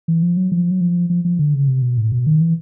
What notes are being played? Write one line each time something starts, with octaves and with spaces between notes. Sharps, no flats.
E3
F3
F#3
F3
F#3
F3
F3
F3
D3
C#3
C3
B2
A2
B2
D#3
E3